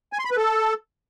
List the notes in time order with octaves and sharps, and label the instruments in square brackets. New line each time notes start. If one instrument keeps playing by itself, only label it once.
[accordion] G#5
C6
B5
B4
A4